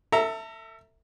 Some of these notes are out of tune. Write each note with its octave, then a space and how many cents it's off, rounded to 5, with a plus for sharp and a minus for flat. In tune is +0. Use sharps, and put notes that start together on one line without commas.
A4 +35 E5 -5 A#5 +0